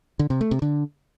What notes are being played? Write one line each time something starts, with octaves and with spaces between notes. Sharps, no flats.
D3
C3
A3
C3
D3